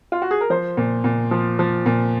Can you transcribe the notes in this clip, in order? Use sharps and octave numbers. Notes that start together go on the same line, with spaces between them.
F4
F#4
G#4
A#4
F3 C5
A#2
A#2
F3
F3
A#2